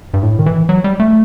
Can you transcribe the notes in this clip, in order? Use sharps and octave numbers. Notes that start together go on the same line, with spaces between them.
G2
A2
D#3
E3
F#3
G3
A3